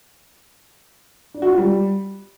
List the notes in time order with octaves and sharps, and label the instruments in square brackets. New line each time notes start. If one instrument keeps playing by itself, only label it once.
[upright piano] D4
F#4
F4
G3